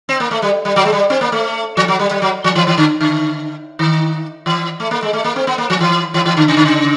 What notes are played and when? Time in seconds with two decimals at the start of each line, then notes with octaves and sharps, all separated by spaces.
0.09 C4
0.20 A#3
0.31 A3
0.42 G3
0.65 G3
0.76 F#3
0.86 G#3
0.93 G3
1.10 C4
1.21 A#3
1.32 A3
1.77 F3
1.88 F#3
2.00 G3
2.11 G3
2.22 F#3
2.44 F3
2.55 E3
2.67 E3
2.77 D3
3.01 D3
3.79 D#3
4.46 E3
4.80 A3
4.91 A#3
5.03 G#3
5.13 A3
5.24 A#3
5.36 C4
5.47 B3
5.58 A#3
5.70 F3
5.81 E3
6.14 E3
6.26 E3
6.37 D3
6.48 C#3
6.57 D3
6.65 C#3